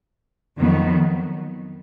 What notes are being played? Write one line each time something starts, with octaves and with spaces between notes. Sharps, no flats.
F2 D#3 F#3 B3